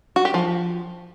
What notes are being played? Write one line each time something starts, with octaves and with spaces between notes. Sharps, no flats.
F#4
G4
F3